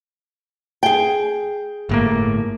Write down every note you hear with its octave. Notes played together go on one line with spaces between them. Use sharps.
G#4 G5
G1 A2 A#3